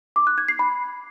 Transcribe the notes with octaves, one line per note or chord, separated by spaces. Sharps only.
D6
F#6
G#6
C7
B5